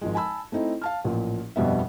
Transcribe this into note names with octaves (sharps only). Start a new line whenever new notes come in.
G#1 F3 G#3
G#5 A5 B5 E6
A3 C4 D#4 E4
F5 A5 F6
A1 A#2 F3
G1 F2 B2 G3 B3 E5